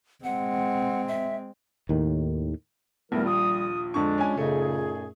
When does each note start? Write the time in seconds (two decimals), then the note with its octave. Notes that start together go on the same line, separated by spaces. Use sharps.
0.24 G#3 C4 F#5
1.08 E5
1.89 D#2 A2 D#3
3.12 A#1 D#2 G3 A3 B3 E4 A#4
3.26 F4 D#6
3.94 F2 D3 G#3 D4 C#6
4.18 C#4 G#5
4.37 F#2 A#2 C#3 A3 D#4 G#4